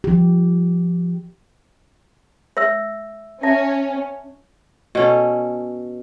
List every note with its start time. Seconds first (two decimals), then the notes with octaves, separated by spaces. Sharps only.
0.04 F3 G4
2.57 C#5 E5 E6
3.43 C#4 E5 A5
4.95 B2 C#4 A4